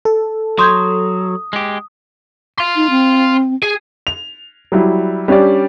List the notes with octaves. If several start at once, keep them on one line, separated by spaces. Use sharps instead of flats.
A4
F#3 C6 D#6 G6 G#6
G#3 G4
F5 C6
D#4
C4
G#4
F7
F#3 G3 E4
G3 C#4 D4 G4 D5